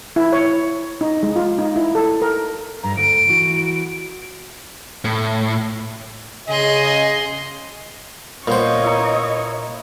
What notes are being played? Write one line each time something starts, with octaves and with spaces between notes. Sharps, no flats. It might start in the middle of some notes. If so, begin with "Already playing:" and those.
E4
C#5
D#4
G#3
F4
D#4
E4
A4
A#4
G2 A#5
D2 D7
E3 F#4
A2
C#3 G#4 D#5 C6
A#2 B3 C5 C#5 D#5
E4 A#5